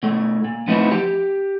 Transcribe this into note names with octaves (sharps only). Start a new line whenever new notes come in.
B2 A3
A#2
F3 A3 B3 C4 D#4 E4
G4